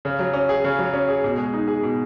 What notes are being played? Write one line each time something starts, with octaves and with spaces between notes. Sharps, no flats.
C#3
F#3
C#4
G#4
C#3
F#3
C#4
G#4
B2
G#3
D#4
G#4
B2